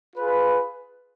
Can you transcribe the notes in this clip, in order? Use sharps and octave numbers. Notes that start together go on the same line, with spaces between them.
F4 G#4 B4